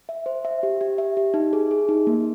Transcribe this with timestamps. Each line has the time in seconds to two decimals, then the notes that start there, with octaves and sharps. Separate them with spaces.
0.09 E5
0.26 C5
0.45 E5
0.63 G4
0.81 G4
0.98 E5
1.17 G4
1.34 D#4
1.53 G#4
1.71 G#4
1.89 D#4
2.07 A#3